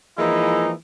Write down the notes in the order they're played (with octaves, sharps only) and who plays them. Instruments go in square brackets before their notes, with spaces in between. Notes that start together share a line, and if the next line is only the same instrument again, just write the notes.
[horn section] E3 F3 G#3 A#3 D#4 E4